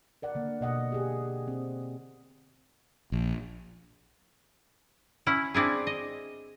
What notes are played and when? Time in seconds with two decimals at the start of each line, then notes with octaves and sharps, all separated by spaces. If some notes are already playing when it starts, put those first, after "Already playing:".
0.22 A#4 D5 F#5
0.35 D3 A#3
0.61 B2 D#5 F#5
0.92 G4 G#4
1.48 C4
3.12 A#1
5.26 C#4 E4 F#5
5.54 C4 D4 E4 G#4
5.87 D#5